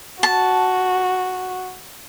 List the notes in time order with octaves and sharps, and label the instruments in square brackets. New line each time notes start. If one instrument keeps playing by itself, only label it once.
[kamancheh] F#4 [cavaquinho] A5